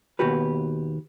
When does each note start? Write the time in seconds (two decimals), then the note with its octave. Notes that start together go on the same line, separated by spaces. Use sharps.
0.19 D#2 B2 F#4 G4 B4